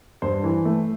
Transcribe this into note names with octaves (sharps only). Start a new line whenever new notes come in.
G2 C5
E3
A3